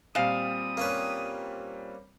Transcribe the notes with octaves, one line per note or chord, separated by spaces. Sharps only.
A#2 G3 C4 F5 D#6 E7
A#3 C#4 B4